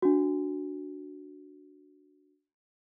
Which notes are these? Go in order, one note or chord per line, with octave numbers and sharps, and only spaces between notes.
D4 F#4